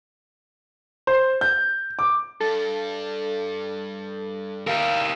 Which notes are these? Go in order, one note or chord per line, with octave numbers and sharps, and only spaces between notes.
C5
G6
D6
G2 A4
G3 G4 A#4 E5 F5